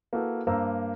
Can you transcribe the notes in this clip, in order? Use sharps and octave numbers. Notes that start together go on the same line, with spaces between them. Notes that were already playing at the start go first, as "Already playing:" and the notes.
A#3 E4 F#4 A4 B4
G2 A#3 C5 A#5 E6